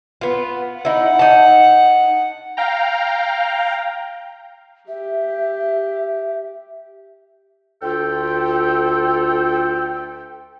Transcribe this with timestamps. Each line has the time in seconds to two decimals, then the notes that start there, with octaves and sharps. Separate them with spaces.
0.21 B3 F4
0.85 D#4 E4 F#5
1.19 D#4 A5
2.57 F5 G5 A#5
4.88 G4 E5
7.81 D2 F4 A4 G5